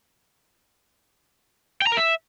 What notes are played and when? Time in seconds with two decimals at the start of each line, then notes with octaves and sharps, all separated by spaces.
1.82 G5
1.87 A#5
1.92 A#4
1.97 E5